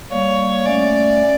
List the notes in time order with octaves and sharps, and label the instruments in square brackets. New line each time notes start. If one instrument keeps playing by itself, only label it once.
[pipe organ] G3 A#3 [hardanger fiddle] C#5
[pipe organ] A3 C#4 [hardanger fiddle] D5